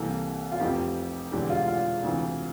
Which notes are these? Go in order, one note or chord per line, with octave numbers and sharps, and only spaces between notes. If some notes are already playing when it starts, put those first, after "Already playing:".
Already playing: C2 C3 E3 A#3 A4
F4
F1 F2 C3 F3 G4
E1 E2 D3 G4
F4
F4
D2 C3 E3